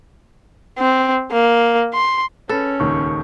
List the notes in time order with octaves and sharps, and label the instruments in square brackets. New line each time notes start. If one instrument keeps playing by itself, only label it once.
[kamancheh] C4
A#3
C6
[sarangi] C#4 [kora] A4 [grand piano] B4
[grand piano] D#1 C#2 D#3 [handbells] C#6